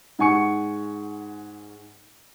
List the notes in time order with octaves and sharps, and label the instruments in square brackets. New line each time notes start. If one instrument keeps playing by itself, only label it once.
[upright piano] G#2 F#5 G#5 C#6 C#7